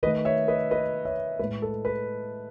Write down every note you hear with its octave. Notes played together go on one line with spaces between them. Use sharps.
D#3 A3 B4 D#5
C#5 E5
B4 D#5
B4 D#5
C#5 E5
A2 G#3 B4
A4
B4